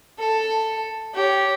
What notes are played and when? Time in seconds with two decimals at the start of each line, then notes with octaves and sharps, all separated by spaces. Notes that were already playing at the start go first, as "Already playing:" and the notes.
0.19 A4
1.14 G4 C#5